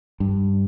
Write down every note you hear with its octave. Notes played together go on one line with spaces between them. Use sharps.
G2